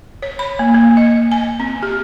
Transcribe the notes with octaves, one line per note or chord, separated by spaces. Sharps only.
C#5
B5
A#3
A#3
D#5
G#5
C4
G4